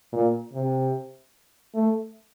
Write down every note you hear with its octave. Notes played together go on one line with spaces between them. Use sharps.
A#2
C3
A3